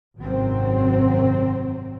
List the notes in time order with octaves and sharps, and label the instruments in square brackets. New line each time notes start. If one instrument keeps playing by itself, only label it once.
[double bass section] G#1 F#2 C3 F#3 C4